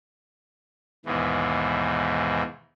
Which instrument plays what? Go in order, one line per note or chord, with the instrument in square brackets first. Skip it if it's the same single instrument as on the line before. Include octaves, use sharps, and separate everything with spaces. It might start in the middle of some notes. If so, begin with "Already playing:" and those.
[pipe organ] D#2 G#2 B2 E3